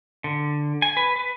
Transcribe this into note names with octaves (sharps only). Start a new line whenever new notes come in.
D3
G#5
B4
B4